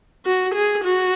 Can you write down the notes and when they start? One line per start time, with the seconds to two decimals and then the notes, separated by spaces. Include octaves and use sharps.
0.26 F#4
0.55 G#4
0.84 F#4